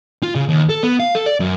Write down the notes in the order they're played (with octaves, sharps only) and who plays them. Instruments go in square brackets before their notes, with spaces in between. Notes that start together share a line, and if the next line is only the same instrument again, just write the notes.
[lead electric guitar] F4
C#3
D#2
A4
B3
F5
A4
D5
F#2